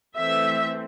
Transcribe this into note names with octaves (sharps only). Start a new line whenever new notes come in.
E3 A3 C4 E5